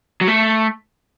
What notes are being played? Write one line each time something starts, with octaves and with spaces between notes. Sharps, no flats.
F#3
A3